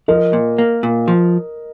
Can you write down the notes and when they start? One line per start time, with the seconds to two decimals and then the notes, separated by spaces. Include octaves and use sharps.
0.08 F3 A#4 D#5
0.33 A#2
0.58 A#3
0.83 A#2
1.08 F3